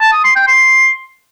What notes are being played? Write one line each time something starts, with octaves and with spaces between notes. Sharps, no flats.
A5
D#6
C6
G5
C6